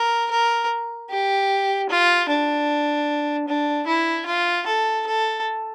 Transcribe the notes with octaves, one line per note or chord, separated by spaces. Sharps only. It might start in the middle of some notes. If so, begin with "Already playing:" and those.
Already playing: A#4
A#4
G4
F4
D4
D4
E4
F4
A4
A4